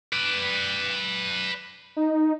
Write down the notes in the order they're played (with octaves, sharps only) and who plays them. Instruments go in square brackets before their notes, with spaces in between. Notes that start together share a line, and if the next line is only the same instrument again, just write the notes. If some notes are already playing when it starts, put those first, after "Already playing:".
[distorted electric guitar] B4 D5
[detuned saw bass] D#4